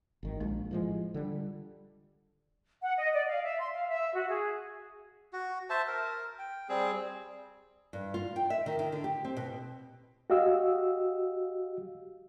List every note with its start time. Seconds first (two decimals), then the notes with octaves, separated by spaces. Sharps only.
0.23 G#1 D#3
0.40 A#1 G#3
0.71 A2 F3 G#3 F4 G4
1.14 D3 G3
2.82 F#5
2.98 D#5
3.13 D5
3.28 F5
3.44 E5
3.60 C6
3.73 F5
3.88 E5
4.14 F#4
4.29 G#4
5.33 F#4
5.70 C5 E5 A5
5.88 A#4
6.38 G5
6.69 G3 C4 G#4
7.93 G2
8.14 F4
8.36 G5
8.50 E5
8.66 D#3
8.79 D#3
8.92 D3
9.04 G4
9.25 C4
9.37 B2
10.30 F#4 G4 D#5 F5 E6